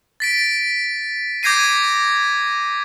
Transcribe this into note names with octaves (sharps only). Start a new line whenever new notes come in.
A6 B6 D7
D6 G6 G#6 A#6 C7 D#7